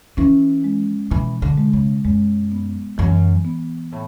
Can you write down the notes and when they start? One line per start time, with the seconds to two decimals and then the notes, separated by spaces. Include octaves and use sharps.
0.17 E3 C#4
0.64 G#3
1.11 B2 E3
1.42 D3
1.57 G#3
1.73 C#3
2.05 F#2 G#3
2.52 B3
2.98 F#2 E3
3.45 B3
3.92 A2